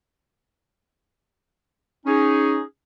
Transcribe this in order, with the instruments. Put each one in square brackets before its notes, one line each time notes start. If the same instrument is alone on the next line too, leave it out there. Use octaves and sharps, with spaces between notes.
[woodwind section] C#4 D#4 G#4